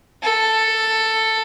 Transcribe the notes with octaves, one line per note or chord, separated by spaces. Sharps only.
A4